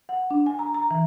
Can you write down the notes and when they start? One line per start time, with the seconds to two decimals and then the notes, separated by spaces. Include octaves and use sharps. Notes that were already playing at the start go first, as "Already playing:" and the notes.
0.09 F#5
0.31 D4
0.46 G#5
0.59 A#5
0.74 A#5
0.91 E3